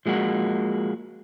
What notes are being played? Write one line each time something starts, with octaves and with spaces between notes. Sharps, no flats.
F3 G#3 A#3 F#4